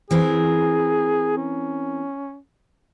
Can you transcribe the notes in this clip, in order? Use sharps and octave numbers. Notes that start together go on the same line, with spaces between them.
E3 C4 G#4 A#4
C#4